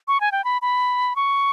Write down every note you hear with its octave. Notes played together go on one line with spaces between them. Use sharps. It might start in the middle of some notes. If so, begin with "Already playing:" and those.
C#6
G#5
G5
B5
B5
C#6